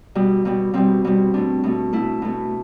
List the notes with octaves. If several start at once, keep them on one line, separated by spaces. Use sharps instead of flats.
B2 G3
B2 G3
B2 G3 C4
B2 G3
B2 A3 D4
B2 A3
B2 A3 E4
B2 A3